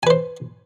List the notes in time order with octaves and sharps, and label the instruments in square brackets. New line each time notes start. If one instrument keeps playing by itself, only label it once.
[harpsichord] G#5
B4
C5